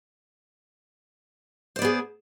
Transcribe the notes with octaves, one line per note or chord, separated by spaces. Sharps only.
B3 G#4 C5 D5